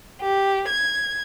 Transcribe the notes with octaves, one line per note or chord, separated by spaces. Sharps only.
G4
G#6